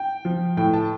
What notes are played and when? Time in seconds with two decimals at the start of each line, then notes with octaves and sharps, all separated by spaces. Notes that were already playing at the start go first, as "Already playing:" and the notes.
Already playing: G5
0.25 F3
0.57 A2 G5
0.73 A5